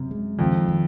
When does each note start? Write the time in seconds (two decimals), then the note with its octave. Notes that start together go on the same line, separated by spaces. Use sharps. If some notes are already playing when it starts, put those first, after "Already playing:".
Already playing: F#2 C3
0.11 G#3
0.39 F2 D#3
0.68 D#3